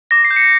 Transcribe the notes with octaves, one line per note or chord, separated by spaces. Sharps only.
D6 A#6
C7
G6
C#7